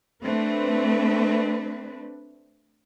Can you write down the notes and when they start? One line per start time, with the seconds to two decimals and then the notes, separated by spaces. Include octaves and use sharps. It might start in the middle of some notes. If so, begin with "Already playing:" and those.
0.22 A3 C4 D4 B4